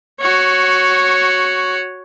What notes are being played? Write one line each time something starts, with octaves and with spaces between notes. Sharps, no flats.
F#4 C#5